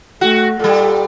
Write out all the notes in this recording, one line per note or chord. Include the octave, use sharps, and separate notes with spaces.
A3 F#4
A#2 G3 A4